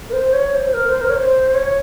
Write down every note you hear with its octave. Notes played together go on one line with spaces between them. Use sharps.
A#4
C5
C#5
C5
C5
A#4
C5
A#4
C#5
C5
C#5